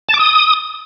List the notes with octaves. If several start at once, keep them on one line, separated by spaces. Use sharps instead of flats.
A5
D6
D#6